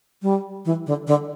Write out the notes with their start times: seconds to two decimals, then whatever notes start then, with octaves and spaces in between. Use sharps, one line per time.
0.22 G3
0.65 E3
0.86 D3
1.07 D3